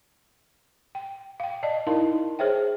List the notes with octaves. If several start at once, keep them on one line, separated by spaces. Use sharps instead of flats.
G5
F5 G5
D5 D#5 A5
D#4 E4 A#4 F5 A5
G#4 C5 C#5 E5 G5